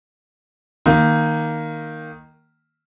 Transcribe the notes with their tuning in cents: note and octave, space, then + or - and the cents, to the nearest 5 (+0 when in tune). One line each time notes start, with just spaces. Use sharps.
D#3 -5 A#3 +0